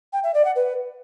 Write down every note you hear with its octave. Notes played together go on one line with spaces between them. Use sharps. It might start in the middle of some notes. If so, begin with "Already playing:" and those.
G5
E5
D5
F#5
B4